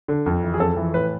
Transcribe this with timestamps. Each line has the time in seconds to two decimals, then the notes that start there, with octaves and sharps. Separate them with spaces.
0.08 D3
0.26 F2
0.43 E3
0.54 G#4
0.60 F2 A4
0.77 E3
0.94 A2 B4